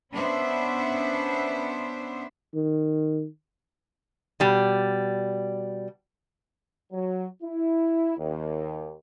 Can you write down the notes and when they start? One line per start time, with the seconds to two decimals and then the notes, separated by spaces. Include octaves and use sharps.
0.13 B3 C#4 D4 C5 E5
2.54 D#3
4.40 B2 G3
6.92 F#3
7.43 E4
8.18 D#2